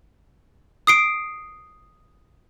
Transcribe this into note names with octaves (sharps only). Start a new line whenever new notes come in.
D#6 C7 D7